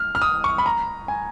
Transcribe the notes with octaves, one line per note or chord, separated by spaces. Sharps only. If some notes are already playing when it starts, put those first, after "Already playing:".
Already playing: F6
F6
D#6
C#6
B5
A#5
G#5